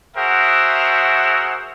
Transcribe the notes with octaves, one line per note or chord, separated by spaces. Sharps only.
F#4 G#4 A#4 C5 E5 F#5